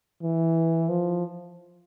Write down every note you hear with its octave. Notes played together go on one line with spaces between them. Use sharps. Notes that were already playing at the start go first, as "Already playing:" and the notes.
E3
F3